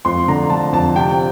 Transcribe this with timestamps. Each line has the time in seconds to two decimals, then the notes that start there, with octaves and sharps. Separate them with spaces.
0.05 F2 C6
0.28 D3 A#5
0.50 D3 A5
0.73 F2 A5
0.96 C3 G5